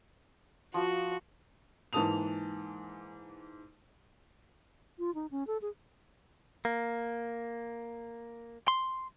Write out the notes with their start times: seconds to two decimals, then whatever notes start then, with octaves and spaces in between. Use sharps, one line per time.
0.74 F3 F#4
1.93 G#2 E3 A#3 A5 D#6 F7
4.99 F4
5.15 D#4
5.31 C#4
5.47 A4
5.62 G#4
6.65 A#3
8.68 C6